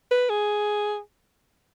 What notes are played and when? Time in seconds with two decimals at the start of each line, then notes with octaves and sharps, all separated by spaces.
0.11 B4
0.30 G#4